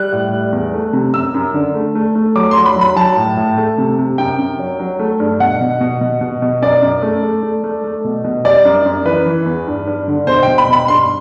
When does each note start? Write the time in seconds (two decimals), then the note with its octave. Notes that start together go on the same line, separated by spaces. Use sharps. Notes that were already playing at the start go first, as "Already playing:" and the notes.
Already playing: G3 F#6
0.12 A2
0.33 G3
0.52 E2
0.74 A3
0.93 C3
1.14 F#2 E6
1.34 F#2
1.54 D3
1.74 A3
1.95 A3
2.15 A3
2.35 F#3 D6
2.51 F#3 C6
2.66 B5
2.76 F#3
2.81 B5
2.96 F#3 A5
3.17 A2
3.37 A2
3.57 A3
3.78 C3
3.99 C3
4.18 F#2 G5
4.39 F#2
4.59 F#3
4.79 F#3
4.99 A3
5.20 G2
5.40 B2 F#5
5.60 B2
5.81 B2
6.01 B2
6.21 B2
6.42 B2
6.62 F#2 D5
6.82 F#2
7.02 A3
7.23 A3
7.43 A3
7.64 A3
7.84 A3
8.04 B2
8.24 B2
8.45 G3 D5
8.65 F#2
8.86 F#2
9.05 E3 B4
9.26 E3
9.46 E2
9.67 G2
9.87 G2
10.08 D3
10.27 B2 C5
10.43 B2 G5
10.58 B5
10.69 B2 B5
10.88 G2 C6